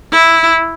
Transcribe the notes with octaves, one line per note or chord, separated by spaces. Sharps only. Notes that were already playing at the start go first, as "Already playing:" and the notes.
E4